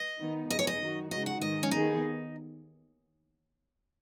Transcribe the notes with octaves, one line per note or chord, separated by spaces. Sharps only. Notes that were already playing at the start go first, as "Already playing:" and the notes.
Already playing: D#5
D#3 B3 D#4
F#2 C#3 B3 D#4 G#4 D#5
C#5
D#5
D#3 F#3 D#4 F#4
C#3 G#3 D#4 F#4 D#5
F#5
G#2 D#3 G#3 D#5
C#4
D#2 D#3 B3 D#4 G#4